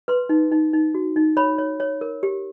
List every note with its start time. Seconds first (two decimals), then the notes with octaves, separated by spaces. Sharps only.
0.08 B4 C6
0.29 D#4
0.52 D#4
0.73 D#4
0.94 F#4
1.16 D#4
1.37 C#5 B5
1.58 C#5
1.80 C#5
2.01 A#4
2.23 G4